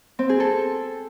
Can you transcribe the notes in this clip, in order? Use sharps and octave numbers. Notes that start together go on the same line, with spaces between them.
C4
G#4
A4